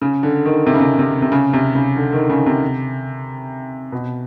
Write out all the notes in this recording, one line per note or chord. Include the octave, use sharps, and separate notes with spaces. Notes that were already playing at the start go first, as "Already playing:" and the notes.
C#3
D3
D#3
C3
C#3
C3
C3
C3
C#3
C3
C#3
D3
D#3
C#3
C3
B2